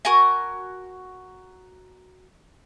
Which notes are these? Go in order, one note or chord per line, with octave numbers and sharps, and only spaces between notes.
F#4 A#4 G#5 A#5